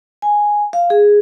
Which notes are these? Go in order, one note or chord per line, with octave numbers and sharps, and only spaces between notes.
G#5
F5
G#4